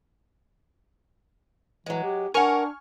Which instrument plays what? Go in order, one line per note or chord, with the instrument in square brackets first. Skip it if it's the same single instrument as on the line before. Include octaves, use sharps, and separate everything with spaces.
[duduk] E3 [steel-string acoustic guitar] F#3 G#3
[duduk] G4
[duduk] D4 [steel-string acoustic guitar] A#4 F#5 [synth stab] G#5 C#6 F6